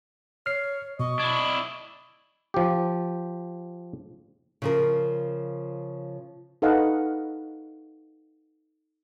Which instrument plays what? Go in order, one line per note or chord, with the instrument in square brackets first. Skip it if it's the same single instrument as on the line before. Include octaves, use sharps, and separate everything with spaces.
[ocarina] C#5 [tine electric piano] F6 C7
[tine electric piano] B2 [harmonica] D#5 [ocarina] C#6
[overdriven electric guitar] D4 E4 [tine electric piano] G#6
[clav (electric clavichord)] F3 G4
[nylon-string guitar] C#3 F3 A#4
[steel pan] D#4 A4 B4 D#5 F5 F#5